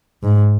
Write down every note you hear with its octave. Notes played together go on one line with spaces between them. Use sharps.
G#2